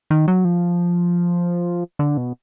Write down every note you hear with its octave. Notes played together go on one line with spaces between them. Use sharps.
D#3
F#3
F3
D3
B2